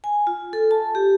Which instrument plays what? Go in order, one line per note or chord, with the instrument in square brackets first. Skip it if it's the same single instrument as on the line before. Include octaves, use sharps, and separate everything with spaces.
[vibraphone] G#5
F4
A4
A5
G4